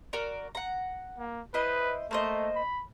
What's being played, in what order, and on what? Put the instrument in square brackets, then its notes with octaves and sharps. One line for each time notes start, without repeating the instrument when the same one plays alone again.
[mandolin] F#4 A#4 D5
F#5 A#5
[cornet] A#3
[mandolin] E4 C5 D#5 [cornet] B4
[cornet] A3 [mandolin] A#3 C5 D#5
[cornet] B5